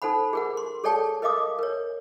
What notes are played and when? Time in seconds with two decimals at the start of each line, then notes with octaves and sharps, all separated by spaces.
0.02 D#4 A4 C5 F#5 B5
0.33 G#4 A#4 F#5
0.57 C6
0.84 G#4 A4 C#5 D5 G5 A5
1.22 A#4 D#5 F5 D6 D#6
1.59 A#4 C#5